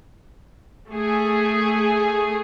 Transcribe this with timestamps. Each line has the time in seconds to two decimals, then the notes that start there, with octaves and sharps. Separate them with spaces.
0.90 A3 G#4